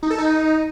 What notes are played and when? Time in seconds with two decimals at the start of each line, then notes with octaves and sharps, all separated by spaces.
0.03 D#4
0.10 A4
0.18 D#4